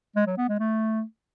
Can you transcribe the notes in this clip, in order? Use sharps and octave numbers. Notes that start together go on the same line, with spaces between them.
G#3
F#3
B3
G#3
A3